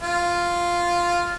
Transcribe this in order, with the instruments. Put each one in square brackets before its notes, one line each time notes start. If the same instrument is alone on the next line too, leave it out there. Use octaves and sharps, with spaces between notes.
[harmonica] F4